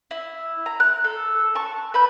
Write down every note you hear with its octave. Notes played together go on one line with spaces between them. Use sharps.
E4
A#5
F#6
A4
A5 C#6
B4 B5 G6